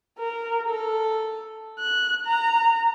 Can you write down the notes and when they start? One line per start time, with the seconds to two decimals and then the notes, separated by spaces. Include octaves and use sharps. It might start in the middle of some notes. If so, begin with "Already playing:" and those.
0.19 A#4
0.69 A4
1.79 F#6
2.25 A#5